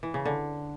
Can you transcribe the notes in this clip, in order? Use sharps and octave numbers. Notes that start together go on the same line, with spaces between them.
E3
C#3
D3